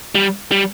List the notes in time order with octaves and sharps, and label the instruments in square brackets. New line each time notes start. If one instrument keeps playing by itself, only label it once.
[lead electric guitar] G3
G3